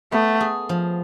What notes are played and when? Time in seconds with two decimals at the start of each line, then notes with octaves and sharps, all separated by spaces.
0.12 A3 B3
0.40 G#4
0.69 F3